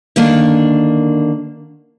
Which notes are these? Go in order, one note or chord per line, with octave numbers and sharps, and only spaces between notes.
D3 D#3 A#3 D4